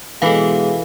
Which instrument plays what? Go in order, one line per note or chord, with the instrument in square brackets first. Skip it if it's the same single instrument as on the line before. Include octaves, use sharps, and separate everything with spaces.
[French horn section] B2 G#3 [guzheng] E3 B5 [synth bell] A4 F5